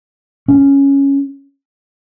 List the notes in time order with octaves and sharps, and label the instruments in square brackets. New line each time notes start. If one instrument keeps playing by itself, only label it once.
[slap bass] C#4